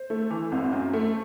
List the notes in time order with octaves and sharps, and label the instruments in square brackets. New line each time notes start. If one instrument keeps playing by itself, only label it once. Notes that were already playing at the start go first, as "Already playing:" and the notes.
Already playing: [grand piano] C5
[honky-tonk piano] A3
E3
G#1
F#2
A3